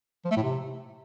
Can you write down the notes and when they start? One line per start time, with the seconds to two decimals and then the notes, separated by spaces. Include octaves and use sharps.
0.25 F3
0.31 A3
0.37 A2
0.43 C3